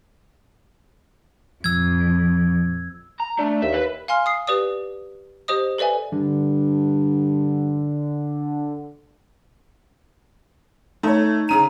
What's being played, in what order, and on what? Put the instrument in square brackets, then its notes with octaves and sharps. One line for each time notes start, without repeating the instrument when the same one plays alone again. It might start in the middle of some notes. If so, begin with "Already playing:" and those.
[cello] F2 [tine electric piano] A#2 F3 [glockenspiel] E6 G#6
[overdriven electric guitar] A#5
[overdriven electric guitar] A3 [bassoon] D4
[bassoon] D#2 [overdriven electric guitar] E5
[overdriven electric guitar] B4
[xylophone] F5 G#5 C6 F6
D#6 C7
G4 B4 D5 D#6
G4 C5 D#5 D#6
A4 B4 D5 E5 G#5
[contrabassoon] G2 [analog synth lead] D3
[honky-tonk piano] A3 [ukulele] D#4 C#5
[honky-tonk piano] C#3 D#7 [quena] A#5